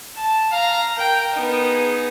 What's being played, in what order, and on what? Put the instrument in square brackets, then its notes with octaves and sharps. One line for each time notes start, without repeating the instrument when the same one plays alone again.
[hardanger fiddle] A5
[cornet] F5 [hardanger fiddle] A#5
[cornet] A#4 [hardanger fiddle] G5
[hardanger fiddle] B3 D#4
[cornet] G#4